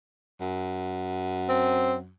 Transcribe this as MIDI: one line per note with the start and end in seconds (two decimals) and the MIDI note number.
0.40 2.12 42
1.49 1.95 60